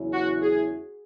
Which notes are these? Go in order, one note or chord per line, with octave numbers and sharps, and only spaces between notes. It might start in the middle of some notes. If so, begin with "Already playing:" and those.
Already playing: E2 C#3 F#3 C#4 E4
F#4
G#4